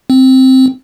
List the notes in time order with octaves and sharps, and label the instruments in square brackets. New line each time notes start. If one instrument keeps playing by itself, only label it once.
[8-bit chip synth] C4